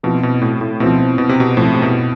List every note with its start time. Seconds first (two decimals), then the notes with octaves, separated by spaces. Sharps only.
0.03 B2 F3 C4 E4
0.23 B2
0.42 A2
0.61 A2
0.80 B2 F3 C4 E4
1.18 B2
1.29 C3
1.40 B2
1.57 A2 F3 C4 E4
1.74 C3
1.82 B2